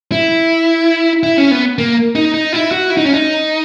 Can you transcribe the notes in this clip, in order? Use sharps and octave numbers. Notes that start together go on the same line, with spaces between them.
E4
E4
C#4
B3
A#3
D#4
D#4
E4
F#4
E4
D#4
C#4
D#4